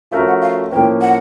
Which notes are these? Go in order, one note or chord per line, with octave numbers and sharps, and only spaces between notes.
F3 A3 C#4 F#4 A#4 F5
F#5
F5
A2 F3 A#3 C#4 G5
F#5